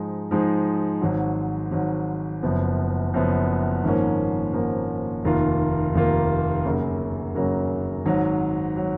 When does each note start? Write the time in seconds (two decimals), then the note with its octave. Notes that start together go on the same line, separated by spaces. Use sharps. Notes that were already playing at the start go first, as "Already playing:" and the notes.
Already playing: G#2 F3 G#3 D#4
0.31 G#2 F3 G#3 D#4
1.01 G#1 G#2 F#3
1.71 G#1 G#2 F#3
2.43 F#1 F#2 F3 B3
3.13 F#1 F#2 F3 B3
3.83 G#1 G#2 F3 A#3 C#4
4.53 G#1 G#2 F3 A#3 C#4
5.25 F1 D#2 D#3 A#3 F4
5.95 F1 D#2 D#3 A#3 F4
6.65 F#2 C#3 F#3 A#3
7.35 F#2 C#3 F#3 A#3
8.06 G#1 G#2 F#3
8.76 F#3